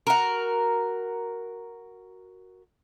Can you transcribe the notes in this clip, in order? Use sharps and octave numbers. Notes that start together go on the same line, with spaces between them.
F#4 A#4